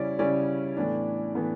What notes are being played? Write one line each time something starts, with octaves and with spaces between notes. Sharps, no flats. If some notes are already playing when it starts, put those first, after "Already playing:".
Already playing: C#3 G3 C#4 E4 C#5 D5
C#3 G3 C#4 E4 D5
A2 E3 B3 D4
A2 E3 B3 D4